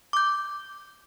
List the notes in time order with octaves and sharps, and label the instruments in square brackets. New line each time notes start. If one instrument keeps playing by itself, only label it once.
[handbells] D6 G6